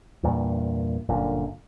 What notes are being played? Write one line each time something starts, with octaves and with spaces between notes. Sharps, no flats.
E2 G2 A#2
G1 F#2 A#2 D3